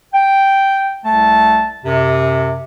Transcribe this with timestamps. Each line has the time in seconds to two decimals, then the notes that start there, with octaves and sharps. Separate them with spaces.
0.13 G5
1.05 C2 A3 A5
1.84 F#2 C3